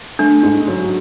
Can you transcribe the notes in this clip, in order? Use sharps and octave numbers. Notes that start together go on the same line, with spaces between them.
A3 D4
G#2
F#3